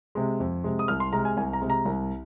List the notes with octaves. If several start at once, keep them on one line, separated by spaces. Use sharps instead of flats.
C3 G#3
F2
C3 G#3
D#6
C2 F6
C6
C3 G#3 A#5
G#5
C2 G#5
A#5
C3 G#3
A#5
C2